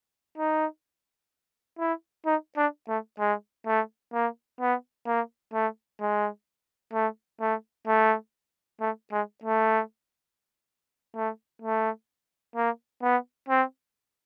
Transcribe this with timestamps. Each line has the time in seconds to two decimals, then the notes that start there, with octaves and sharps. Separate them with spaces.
0.38 D#4
1.79 E4
2.26 D#4
2.57 D4
2.88 A3
3.19 G#3
3.66 A3
4.13 A#3
4.60 B3
5.06 A#3
5.53 A3
6.00 G#3
6.93 A3
7.40 A3
7.87 A3
8.81 A3
9.12 G#3
9.43 A3
11.15 A3
11.62 A3
12.56 A#3
13.02 B3
13.49 C4